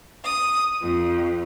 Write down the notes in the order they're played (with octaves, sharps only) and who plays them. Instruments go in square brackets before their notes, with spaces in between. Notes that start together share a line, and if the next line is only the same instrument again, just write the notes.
[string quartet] D#6
F2